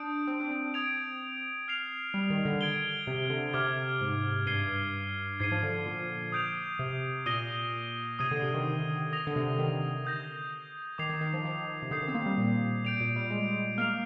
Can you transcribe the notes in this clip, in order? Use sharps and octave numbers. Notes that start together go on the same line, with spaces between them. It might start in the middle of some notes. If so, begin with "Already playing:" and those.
Already playing: D4 D#6 G6 D7
C4
D4
C4
D#6 G#6 D7 F7
F6 C7 F7
G3
D#3
D3
G#6 D7 G7
C3
C3
D3
C3 D6 F6 G#6
G#2
G2 G#6 C7 D#7 G7
G#2 G#6 C7 D#7
F3
D3
A#2
D#6 G6 D7 F7
C3
A#2 D#6 A#6 D#7 G7
C3 D#6 G#6 D#7 G7
D3
C3
D#3
D#6 A#6 F7
D3
C3
D#3
D#6 G6 A#6
D#3 D6 G#6 C7 F7
D#3
D#3
F3
D#3
C3
D3 D#6 G6 C7
D#3
C4
A#3
G3
A#2
A#2 G6 D7 F7
A#2
G3
G#3
A#3 F6 C7 F7